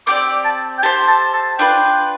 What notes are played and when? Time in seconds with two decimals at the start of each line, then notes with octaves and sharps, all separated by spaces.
0.07 C4 G4 D5 D6
0.45 A5
0.78 G5
0.83 G4 C5 F5 A5
1.08 A5
1.34 A5
1.59 D4 F4 B4 G5